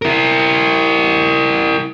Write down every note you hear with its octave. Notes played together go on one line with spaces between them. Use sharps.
E4 A#4